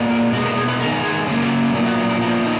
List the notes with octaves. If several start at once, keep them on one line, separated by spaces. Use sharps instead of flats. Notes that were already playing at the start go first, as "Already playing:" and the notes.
Already playing: A#2 G#3 B3
A#4
B2 G#3 B3 F#4
A#4
G#4
B4
D#3 G#3 B3 A#4
G#4
C#3 F#3 A#3 G#4
F4
A#2 F#3 B3
F#4
F#4
A#4
A#2 F3 B3 F#4
D#4